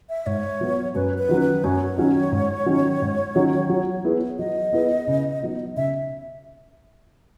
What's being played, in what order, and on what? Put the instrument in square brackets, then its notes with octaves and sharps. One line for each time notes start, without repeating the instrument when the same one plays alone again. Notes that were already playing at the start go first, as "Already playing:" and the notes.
[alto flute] E5
[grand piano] G#2 [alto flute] C#5
[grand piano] F#3 B3
[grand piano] F#2 [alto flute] B4
[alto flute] B4
[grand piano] D#3 F#3 C#4
[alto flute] B4
[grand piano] F#2 [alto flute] C#5
[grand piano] D#3 F#3 C#4
G#2
D#3 F#3 C#4
G#2
D#3 F#3 C#4
F#3
B3 E4 G#4 B4
[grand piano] F#3 [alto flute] D#5
[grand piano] B3 E4 G#4 B4
C#3
F#3 B3 D#4
[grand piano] C#3 [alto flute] E5